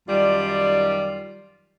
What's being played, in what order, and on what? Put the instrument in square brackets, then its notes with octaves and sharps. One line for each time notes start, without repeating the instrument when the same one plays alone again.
[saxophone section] F#2 D#3 G3 F4 D5